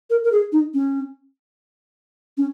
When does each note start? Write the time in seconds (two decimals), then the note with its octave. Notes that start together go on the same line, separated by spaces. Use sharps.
0.10 A#4
0.24 A#4
0.32 G#4
0.52 D#4
0.74 C#4
2.38 C#4